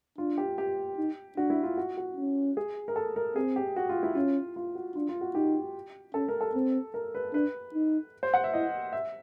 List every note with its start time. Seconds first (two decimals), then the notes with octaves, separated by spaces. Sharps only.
0.18 D4 F4
0.38 G4
0.58 G4
0.98 D#4
1.37 D4 F#4
1.50 E4
1.63 F4
1.77 F#4
1.97 F#4
2.16 C#4
2.57 G#4
2.88 A#4
2.96 A4
3.16 A#4
3.36 C4 G#4
3.56 G4
3.76 F#4
3.89 F4
4.03 E4
4.15 C#4 F4
4.56 F4
4.75 F#4
4.95 D4 F4
5.09 F4
5.21 F#4
5.35 D#4 G4
6.14 C#4 A4
6.28 A#4
6.41 A4
6.55 C4
6.94 A#4
7.15 B4
7.33 D4 B4
7.74 D#4
8.23 C5
8.34 F#5
8.44 E5
8.53 E4 D#5
8.93 E5